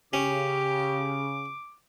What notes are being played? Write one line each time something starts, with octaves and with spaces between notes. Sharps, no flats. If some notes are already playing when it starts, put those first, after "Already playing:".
C#3 C#4 G4 D6